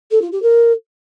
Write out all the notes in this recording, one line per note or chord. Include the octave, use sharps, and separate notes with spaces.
A4
F4
G4
A#4